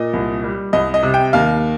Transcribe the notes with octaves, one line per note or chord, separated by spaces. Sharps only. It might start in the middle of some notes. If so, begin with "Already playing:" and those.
Already playing: A#2 D#5
C2
G3
C2 D#5
D#5
C3
G5
D#2 F5